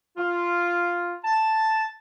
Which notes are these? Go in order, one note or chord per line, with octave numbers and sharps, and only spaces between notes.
F4
A5